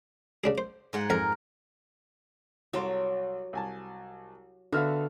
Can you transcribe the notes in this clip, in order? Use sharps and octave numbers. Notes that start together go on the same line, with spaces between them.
C#3 D4 G#4
C5
G#2 G#3 F#5
F2 A#4
C2 F#3 A4 C6 D6
C2 G#5 A5
D3 B3 F#4 E5 F5 F6